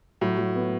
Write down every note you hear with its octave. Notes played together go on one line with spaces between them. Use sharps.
A2 F#3
F#3
B3